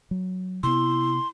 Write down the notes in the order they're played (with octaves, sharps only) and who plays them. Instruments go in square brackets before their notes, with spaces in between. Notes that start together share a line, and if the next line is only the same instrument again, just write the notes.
[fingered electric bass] F#3
[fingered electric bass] C3 B3 [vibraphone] E4 [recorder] C6